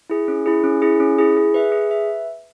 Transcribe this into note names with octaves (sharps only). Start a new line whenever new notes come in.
E4 G#4
C#4
E4 G#4
C#4
E4 G#4
C#4
E4 G#4
G#4
B4 E5
G#4
B4 E5